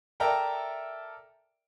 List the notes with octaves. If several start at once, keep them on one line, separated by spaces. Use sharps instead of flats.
A4 A#4 D5 E5 G5 A#5